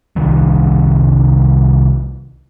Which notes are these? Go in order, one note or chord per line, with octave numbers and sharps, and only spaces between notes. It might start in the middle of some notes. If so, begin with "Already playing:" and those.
C2 D#3 G3